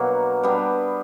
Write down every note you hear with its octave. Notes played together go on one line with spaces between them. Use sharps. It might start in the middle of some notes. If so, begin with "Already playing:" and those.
Already playing: B2 F#3 A#3 D4
G3 B3 D4